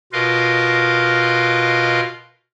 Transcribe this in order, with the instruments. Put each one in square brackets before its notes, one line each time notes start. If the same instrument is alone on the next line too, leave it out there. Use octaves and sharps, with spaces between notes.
[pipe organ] B2 F4 A#4 B4 D#5 F5